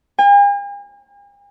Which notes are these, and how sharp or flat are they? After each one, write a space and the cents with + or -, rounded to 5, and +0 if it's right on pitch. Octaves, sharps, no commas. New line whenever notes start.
G#5 -45